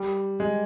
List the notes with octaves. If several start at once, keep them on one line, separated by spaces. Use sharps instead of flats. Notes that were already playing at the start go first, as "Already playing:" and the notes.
Already playing: G3
G#3